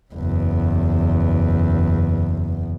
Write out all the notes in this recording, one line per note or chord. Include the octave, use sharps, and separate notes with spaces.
F#1 E2